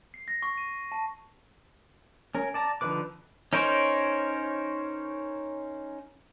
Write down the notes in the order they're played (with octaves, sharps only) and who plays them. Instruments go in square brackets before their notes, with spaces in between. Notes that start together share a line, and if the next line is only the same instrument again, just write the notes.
[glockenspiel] C7
A#6
C#6
D#7
A5
[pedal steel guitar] C#4 A#4
D5 A5 A#5
D3 F3 D#4 B4 D6
C#4 D#4 A#4 C5 C#5